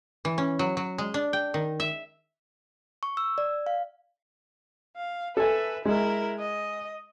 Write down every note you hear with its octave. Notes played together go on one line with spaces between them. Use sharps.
E3
C#4
F#3
F#3
G#3
D4
G5
D#3
E5
C#6
E6
D5
F5
F5
A4 B4 E5 G#5
G#3 E4 A#4
D#5